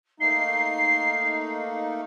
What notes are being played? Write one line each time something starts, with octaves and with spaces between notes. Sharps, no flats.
A3 A#3 D#4 C7